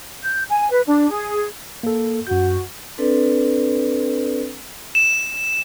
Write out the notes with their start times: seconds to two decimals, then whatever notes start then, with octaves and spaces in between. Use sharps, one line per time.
0.23 G6
0.49 G#5
0.71 B4
0.86 D4
1.10 G#4
1.83 A#3 A4
2.27 F#2 F#4 G6
2.98 C4 D4 A4 B4 D5
4.95 E7